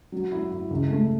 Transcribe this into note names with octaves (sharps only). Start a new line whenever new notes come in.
F#3
E4
E4
C#2
A3